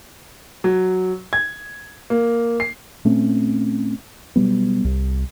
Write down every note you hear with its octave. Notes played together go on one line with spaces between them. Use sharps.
F#3
G#6
A#3
C7
A#2 A3 C4 C#4
B2 F#3 G3 B3
C2